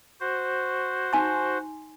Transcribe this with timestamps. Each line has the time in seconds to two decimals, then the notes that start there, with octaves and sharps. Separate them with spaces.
0.20 F#4 C5
1.13 D#4 G#5 C6